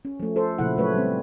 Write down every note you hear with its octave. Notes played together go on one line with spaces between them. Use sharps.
C#4
F3 A3
A4 C5
A#2 C#3 F3 E4 F#5
F#3 A3 B4 C#5
G3 C4